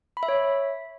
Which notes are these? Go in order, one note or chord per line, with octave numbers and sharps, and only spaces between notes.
B5
E5
C#5